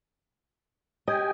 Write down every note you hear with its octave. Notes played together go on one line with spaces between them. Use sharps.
G4 D#5 G5 G#5